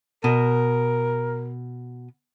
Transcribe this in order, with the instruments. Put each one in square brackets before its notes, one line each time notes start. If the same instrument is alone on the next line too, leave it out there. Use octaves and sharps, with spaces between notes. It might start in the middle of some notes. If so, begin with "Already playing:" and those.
[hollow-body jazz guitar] B2 [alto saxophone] A#4